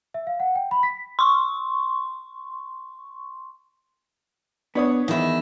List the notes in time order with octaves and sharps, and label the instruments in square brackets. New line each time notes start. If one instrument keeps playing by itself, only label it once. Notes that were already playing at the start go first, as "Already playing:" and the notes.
[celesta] E5
F5
F#5
G5
B5
B6
[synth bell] C6 C#6
[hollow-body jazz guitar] B3 [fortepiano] D4 C#5 D#6
[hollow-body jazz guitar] E2 [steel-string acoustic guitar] D#3 E4 [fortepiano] D#4